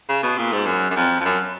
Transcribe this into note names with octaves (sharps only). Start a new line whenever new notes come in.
C#3
B2
A#2
G#2
F#2
F#2
F2
F2
F#2